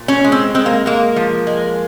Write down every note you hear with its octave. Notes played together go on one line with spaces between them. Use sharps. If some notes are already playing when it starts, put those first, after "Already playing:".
Already playing: A#2
C#4
G#3
C4
G#3 C4
A#3
G#3 A#3
F3
G#3